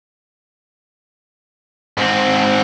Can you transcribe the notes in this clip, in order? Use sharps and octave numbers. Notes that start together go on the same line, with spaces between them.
G#2 C4